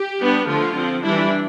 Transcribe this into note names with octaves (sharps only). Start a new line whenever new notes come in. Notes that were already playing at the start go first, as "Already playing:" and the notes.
Already playing: G4
G3 B3 D4
D3 F3 A3 F4
F3 C4
E3 G3 D4 E4